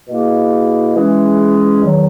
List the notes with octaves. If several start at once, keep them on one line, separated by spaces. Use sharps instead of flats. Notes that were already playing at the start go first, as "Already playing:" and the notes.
B2 A#3 E4 G#4
E3 G#3 C#4 G#4
E2 D#3 F#3